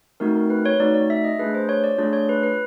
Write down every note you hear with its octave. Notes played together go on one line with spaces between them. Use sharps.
A3 C4 D#4 F#4 A#4
A#4
B4
C#5
A3 C4 D#4 F#4 D5
D5
E5
D#5
A3 D4 F4 G#4 B4
C5
C#5
D5
A3 D4 F4 G#4 D5
C#5
B4
B4